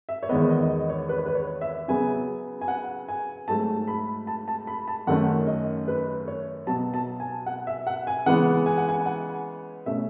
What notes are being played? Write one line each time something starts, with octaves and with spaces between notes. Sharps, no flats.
E5
C#5
E2 D#3 G#3 B3 D#5
D#5
D#5
C#5
B4
C#5
B4
C#5
E5
C#3 F#3 B3 G#5
G#5
F#5
G#5
G#2 F#3 A3 A5
B5
A5
A5
B5
A5
F#2 D#3 A3 C#4 F#5
D#5
B4
C#5
B2 F#3 B3 A5
A5
G#5
F#5
E5
F#5
G#5
C#3 E3 G#3 B3 F#5
G#5
F#5
G#5
F#5
B2 A3 C#4 E5